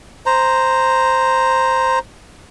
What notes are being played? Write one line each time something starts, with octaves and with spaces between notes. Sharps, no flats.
C5 A#5